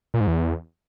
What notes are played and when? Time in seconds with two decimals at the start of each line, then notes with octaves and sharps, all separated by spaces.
0.14 A#2
0.21 G#2
0.27 E2